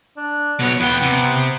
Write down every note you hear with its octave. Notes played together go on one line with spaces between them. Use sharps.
D4
B2 B3 C#5
E2 B3 G5
C3